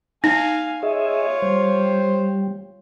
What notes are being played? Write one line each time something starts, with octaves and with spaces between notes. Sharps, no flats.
D#4 F5 G#5
F4 G#4 C#5 D#5 E5
G3 C5